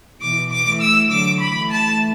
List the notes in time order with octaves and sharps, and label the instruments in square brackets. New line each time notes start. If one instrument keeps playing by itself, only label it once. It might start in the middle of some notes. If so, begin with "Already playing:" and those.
[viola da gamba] B2 E3 [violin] D6
[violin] D6
[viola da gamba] E3 A3
[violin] E6
[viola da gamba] D3 F#3 [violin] D6
[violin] B5
[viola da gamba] E3 A3
[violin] A5